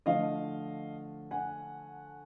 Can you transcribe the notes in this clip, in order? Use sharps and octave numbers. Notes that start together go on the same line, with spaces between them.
D3 F3 A3 D#5 F5
F#5 G#5